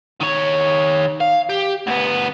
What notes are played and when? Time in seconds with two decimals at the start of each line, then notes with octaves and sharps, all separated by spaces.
0.21 D#3 C#5
1.20 F5
1.49 G4
1.87 D2 B3